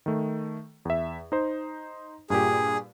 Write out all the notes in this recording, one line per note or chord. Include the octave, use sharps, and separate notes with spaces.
D#3 A3
E2 E5
D#4 C5
G2 A#2 G4 G#4